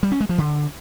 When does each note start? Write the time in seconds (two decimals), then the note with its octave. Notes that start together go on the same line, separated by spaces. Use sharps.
0.03 G3
0.12 C#4
0.20 G#3
0.29 F3
0.38 D3